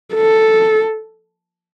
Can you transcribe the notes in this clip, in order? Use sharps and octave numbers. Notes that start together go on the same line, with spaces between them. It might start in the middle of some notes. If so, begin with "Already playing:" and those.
A4